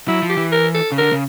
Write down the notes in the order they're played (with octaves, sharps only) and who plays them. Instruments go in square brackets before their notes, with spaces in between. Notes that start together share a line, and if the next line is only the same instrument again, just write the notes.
[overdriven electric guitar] F#3 [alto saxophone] E4
[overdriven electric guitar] F3
[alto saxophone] G4
[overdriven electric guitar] E3
[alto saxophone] A#4
A4
[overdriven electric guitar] C#3
[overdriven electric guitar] D3 [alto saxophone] A#4
[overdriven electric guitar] C#3